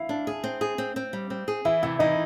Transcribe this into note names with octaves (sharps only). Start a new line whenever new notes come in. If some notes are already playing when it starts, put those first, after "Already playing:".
Already playing: E4 F5
D4
G#4
C4
G#4
C4
C4
G3
C4
G#4
E3 E4 E5
C3 E4 E5
E3 D#4 D#5